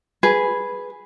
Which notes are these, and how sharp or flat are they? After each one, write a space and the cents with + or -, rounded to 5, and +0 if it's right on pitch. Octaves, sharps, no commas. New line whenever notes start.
G#4 +0 B4 +0